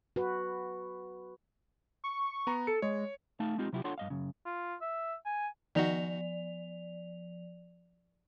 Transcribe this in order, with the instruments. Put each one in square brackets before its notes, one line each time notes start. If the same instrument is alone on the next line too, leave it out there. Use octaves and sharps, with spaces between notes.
[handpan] F#4 B4
[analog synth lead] C#6
[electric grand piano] B3 A#5
[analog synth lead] A4 [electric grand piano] C#7
[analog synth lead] G#3 [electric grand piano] C#5
[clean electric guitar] A3 D#4 F5 A5
G#3 C4 D#4 F4 G4
C3 F#3 E4 F4 G4
D4 F4 A4 C#5 F#5 C6
G2 D#5 F5
F#2 C#3
[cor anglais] F4
E5
G#5
[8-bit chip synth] D#3 D#4 F#4 [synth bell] F3 D5 F7